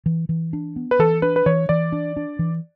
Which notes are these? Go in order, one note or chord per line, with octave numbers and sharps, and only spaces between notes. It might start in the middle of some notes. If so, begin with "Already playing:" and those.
E3
E3
D4
B3
B4
E3 A4
D4 B4
B4
E3 C#5
E3 D5
D4
D4
E3